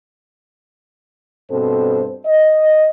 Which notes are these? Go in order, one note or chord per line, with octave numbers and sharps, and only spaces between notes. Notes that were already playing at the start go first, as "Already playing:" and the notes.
G2 B2 C4 A4 C5
D#5